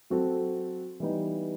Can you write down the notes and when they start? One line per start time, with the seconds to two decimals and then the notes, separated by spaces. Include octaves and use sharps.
0.10 F#3 C4 F#4 A4
1.00 E3 G3 B3 D#4